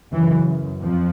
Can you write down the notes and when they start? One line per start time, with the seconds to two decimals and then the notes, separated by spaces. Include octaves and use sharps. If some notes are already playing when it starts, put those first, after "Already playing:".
0.12 F#2 C#3 E3
0.81 F2 F3